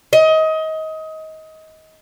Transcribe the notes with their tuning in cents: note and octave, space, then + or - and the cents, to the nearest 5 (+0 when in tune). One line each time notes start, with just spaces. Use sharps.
D#5 +25